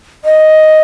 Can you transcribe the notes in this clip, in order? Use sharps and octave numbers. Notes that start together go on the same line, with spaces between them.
D#5